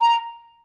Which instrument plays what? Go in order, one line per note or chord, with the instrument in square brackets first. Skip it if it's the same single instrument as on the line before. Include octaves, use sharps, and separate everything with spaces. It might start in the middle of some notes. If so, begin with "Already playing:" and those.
[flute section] A#5